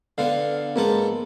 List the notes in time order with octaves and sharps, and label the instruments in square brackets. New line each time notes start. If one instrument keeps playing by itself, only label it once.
[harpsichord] D3 B3 [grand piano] F5
[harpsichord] G#2 B3 A4 [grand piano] A#3